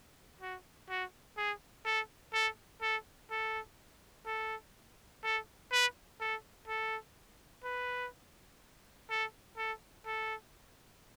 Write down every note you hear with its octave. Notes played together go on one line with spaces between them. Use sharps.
F#4
F#4
G#4
A4
A4
A4
A4
A4
A4
B4
A4
A4
B4
A4
A4
A4